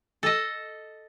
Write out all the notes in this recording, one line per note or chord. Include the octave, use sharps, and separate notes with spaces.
A4 D#5